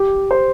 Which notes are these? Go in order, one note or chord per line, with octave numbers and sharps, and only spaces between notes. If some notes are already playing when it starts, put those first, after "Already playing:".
Already playing: G4
C5